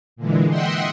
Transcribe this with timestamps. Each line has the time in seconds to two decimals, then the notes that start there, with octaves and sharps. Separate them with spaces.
0.16 A#2 D3 E3 G#3
0.48 D#5 E5 F#5 G5 C6